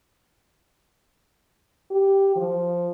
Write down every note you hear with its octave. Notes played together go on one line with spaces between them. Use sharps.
G4
F3